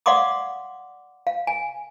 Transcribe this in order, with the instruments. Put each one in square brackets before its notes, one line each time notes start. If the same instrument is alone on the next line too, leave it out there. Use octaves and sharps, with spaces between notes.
[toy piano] D5 F5 F#5 C6 D6 D#6
F5
G#5